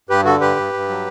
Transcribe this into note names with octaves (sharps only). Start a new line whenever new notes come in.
G2 G4 B4
D3 F#4 A4
G2 G4 B4
G2
G2
F#3